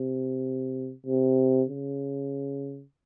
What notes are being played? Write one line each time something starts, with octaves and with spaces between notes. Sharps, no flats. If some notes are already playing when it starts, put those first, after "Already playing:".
Already playing: C3
C3
C#3